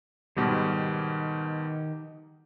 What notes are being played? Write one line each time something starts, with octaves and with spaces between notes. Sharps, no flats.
G#2 B2 D#3 G3 G4